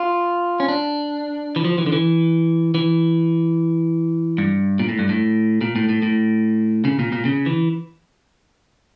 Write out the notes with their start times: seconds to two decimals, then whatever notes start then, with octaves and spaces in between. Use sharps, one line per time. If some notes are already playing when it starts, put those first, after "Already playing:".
Already playing: F4
0.60 C#4
0.68 D4
1.56 E3
1.64 F3
1.78 E3
1.86 D3
1.92 E3
2.75 E3
4.38 G2
4.79 A#2
4.89 A2
4.99 G2
5.09 A2
5.61 A#2
5.76 A2
5.89 A2
6.03 A2
6.85 C#3
6.99 A#2
7.12 A#2
7.25 C#3
7.46 E3